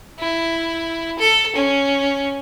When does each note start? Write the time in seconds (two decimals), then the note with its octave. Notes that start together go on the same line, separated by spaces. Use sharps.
0.19 E4
1.19 A4
1.55 C#4